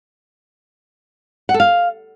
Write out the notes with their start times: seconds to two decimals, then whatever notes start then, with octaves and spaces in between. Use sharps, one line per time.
1.49 F#5
1.54 A4
1.60 F5